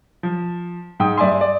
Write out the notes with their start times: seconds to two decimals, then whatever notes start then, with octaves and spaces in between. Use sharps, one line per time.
0.23 F3
1.00 G#2 G5 D#6
1.18 G2 D5 E5 G#5 C6
1.41 D5